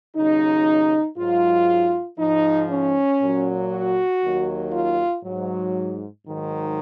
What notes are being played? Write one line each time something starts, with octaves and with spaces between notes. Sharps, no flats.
D#2 C#3 F#3 D#4
G#2 F#3 F4
G#2 F3 D#4
C#4
A#2 F#3
F#4
D#2 D#3 F#3
F4
G#2 F#3
G#2 D#3 F#3